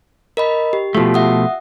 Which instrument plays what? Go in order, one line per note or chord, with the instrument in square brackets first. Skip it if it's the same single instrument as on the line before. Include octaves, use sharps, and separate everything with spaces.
[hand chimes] A#4 D#5 B5
G4
[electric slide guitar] B2 F3 A3 [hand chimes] F4 G4
[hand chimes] E5 F#5 D#6